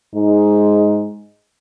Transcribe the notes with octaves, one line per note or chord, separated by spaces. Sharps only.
G#2 G#3 D#4